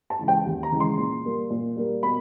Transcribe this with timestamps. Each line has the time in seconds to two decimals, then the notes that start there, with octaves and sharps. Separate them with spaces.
0.10 A5
0.19 C#3 E3 G#3
0.28 G5
0.45 D#2
0.63 A#5
0.72 C#3 E3 G#3
0.80 C6
0.97 A#2
1.25 G3 A#3
1.50 A#2
1.76 G3 A#3
2.03 B2 B5